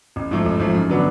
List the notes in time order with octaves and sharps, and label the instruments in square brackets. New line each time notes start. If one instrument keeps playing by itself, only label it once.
[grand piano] A1
G#2 F3 A3
A1
G#2 F3 A3
F#2
D3 F#3 B3 D4